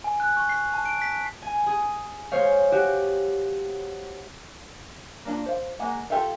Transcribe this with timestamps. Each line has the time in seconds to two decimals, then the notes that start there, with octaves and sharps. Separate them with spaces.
0.04 G#5
0.20 F#6
0.37 C#6
0.49 C7
0.74 A5
0.85 D7
1.02 B6
1.42 G#5
1.66 G#4
2.32 G#3 C5 C#5 F5
2.72 F#4 G4
5.25 A#3 D4 F4
5.46 C5 F5
5.79 G#3 A#3 F#5 A#5
6.10 F4 G4 A4 E5 F5